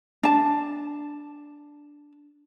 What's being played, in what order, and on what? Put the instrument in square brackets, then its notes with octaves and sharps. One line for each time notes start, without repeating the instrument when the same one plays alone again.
[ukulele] D4 A5